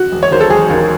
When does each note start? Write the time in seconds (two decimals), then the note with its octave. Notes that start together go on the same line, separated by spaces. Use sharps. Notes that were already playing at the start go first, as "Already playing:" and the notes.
Already playing: F#4
0.12 E1
0.23 C#5
0.30 D#2 D#3 F#3 C5
0.41 A4
0.50 E1 G#4
0.70 D#2 D#3 F#3